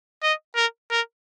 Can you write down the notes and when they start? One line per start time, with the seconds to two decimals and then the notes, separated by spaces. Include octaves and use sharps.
0.23 D#5
0.56 A#4
0.91 A#4